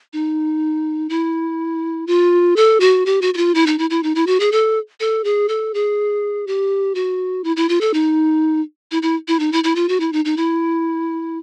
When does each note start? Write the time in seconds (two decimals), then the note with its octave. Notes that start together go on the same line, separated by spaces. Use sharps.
0.13 D#4
1.09 E4
2.07 F4
2.56 A4
2.80 F#4
3.06 G4
3.22 F#4
3.34 F#4
3.37 F4
3.55 E4
3.66 D#4
3.78 E4
3.90 E4
4.03 D#4
4.15 E4
4.27 F#4
4.40 G#4
4.52 A4
5.00 A4
5.24 G#4
5.49 A4
5.74 G#4
6.47 G4
6.95 F#4
7.44 E4
7.56 E4
7.69 F4
7.81 A4
7.94 D#4
8.91 E4
9.02 E4
9.28 E4
9.39 D#4
9.52 E4
9.64 E4
9.75 F4
9.89 F#4
10.00 E4
10.13 D#4
10.25 D#4
10.37 E4